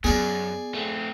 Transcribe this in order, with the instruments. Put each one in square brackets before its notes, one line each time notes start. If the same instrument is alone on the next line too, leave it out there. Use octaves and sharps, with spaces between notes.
[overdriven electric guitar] F#2 [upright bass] B3 [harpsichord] G#4 D5
[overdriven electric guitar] A3 C4